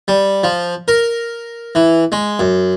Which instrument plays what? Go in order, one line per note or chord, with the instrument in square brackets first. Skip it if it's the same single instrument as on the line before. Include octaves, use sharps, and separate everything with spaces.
[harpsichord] G3
F3
A#4
E3
G#3
F#2